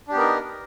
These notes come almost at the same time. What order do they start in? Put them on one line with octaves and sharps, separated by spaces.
D4 G4 B3 A#4 D#4